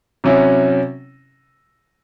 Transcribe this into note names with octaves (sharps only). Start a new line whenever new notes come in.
C3 F#3 C#4 E4